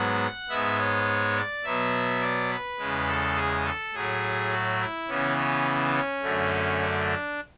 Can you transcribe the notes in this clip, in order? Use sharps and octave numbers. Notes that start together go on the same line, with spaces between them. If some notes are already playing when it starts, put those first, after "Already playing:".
Already playing: G#2 F#3 B3 F#5
G#2 G#3 B3 E5
C#5
D5
B2 F#3 B3 E5
D5
B4
E2 C#3 G#3
A4
G#4
A4
A2 F#3 A3 G#4
F#4
E4
C#3 E3 B3 C#4
C#4
C#4
F#2 D3 A3
D4